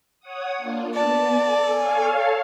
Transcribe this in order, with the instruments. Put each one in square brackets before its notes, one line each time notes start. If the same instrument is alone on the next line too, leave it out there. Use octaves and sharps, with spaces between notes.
[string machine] C#5 F#5 D#6
A#3 D4 F4
[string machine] B3 [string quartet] D5 [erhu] A5
[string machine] A4
[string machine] A4 C#5 F5 [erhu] G#5